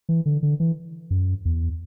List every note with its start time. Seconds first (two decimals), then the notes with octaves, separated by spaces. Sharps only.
0.09 E3
0.26 D3
0.43 D3
0.60 E3
1.10 F#2
1.45 E2